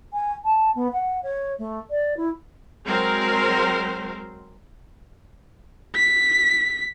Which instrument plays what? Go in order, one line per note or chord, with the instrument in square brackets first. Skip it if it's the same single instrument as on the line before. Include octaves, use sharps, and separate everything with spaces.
[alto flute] G#5
A5
B3
F#5
C#5
A3
D5
E4
[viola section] F#3 G#3 C4 A#4 C5
[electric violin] B6